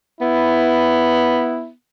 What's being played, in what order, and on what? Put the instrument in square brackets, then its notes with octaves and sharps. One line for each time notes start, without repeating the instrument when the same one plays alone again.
[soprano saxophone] B3 [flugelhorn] E4